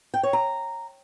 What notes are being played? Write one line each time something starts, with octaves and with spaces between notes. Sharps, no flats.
G5
C#5
A#5